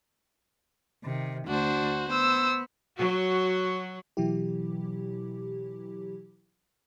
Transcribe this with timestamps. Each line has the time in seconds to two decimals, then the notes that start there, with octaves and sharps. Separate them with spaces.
1.04 C3 D#3
1.47 D2 D4 F#4 C5
2.08 B3 C5 E6
2.97 F#3 F#4
4.17 B2 E3 F#3 E4 G4